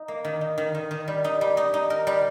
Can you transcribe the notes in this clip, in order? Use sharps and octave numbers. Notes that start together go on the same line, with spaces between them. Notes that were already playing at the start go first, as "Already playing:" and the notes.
Already playing: D#4
A#3
D#3
D#4
D#3
D#3
D#3
G3
D#4
G3
D#4
D#4
A#4
G3